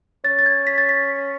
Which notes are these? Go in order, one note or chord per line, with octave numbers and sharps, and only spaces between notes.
C#4 A6
A6
G#6
B6
A6
B6